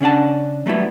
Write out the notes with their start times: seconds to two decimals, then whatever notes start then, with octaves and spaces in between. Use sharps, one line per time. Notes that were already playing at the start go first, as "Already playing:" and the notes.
0.01 C#3 C#4 D4 F#5 A5
0.66 F#3 G3 A3 B3 E4